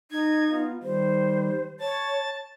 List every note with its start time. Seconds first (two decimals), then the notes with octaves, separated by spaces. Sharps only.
0.11 D#4 G#6
0.49 B3 F4
0.83 D#3 G3 C5
1.80 C#5 A5 A6